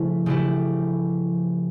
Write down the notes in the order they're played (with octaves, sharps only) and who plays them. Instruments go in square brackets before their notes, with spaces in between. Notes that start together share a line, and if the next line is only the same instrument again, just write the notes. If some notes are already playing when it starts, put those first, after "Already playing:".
Already playing: [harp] C#3 F3 A3 E4
C#3 F3 A3 E4 G4